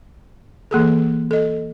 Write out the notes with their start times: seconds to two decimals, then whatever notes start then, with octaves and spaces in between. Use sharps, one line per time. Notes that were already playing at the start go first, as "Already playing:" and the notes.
0.71 E3 A#3 G#4 A4
1.31 A4 D#5